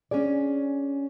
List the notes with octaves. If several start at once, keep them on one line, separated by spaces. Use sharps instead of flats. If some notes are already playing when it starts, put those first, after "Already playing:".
C#4 D4 G#4 D5